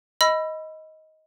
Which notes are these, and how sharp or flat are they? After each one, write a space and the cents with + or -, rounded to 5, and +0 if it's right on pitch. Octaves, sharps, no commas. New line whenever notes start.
D#5 +15 B5 +0 E6 +25